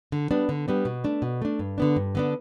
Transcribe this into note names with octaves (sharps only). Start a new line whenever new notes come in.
D3
G3 B3 D4
D3
G3 B3 D4
B2
A3 D4
B2
A3 D4
G2
D3 B3 D4
G2
D3 B3 D4